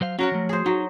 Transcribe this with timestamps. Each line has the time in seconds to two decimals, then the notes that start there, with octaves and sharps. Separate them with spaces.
0.01 F#3 C5 F5
0.19 F#3 C#4 F#4 A#4 F#5
0.32 F3 A3
0.49 G#4 C5
0.66 F#3 D#4